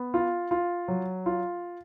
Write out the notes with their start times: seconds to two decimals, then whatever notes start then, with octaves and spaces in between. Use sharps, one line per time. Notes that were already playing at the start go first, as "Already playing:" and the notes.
Already playing: B3
0.14 F4
0.51 F4
0.88 F#3
1.26 F4